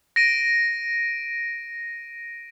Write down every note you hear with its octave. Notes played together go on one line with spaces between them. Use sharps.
A#6 D7 D#7